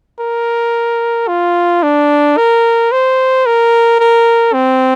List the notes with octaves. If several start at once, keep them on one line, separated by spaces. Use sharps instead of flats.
A#4
F4
D4
A#4
C5
A#4
A#4
C4